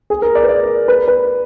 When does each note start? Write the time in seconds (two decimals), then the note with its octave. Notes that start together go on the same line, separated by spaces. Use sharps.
0.10 G#4
0.22 A#4
0.35 D5
0.43 B4
0.49 D5
0.88 B4
1.08 B4